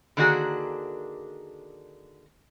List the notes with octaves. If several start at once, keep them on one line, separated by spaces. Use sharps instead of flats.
D3 D#3 A#3 D4 F#4 G#4